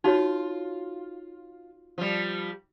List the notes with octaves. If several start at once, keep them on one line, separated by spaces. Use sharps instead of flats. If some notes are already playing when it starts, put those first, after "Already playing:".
D#4 F4 F#4 C#5
F3 G3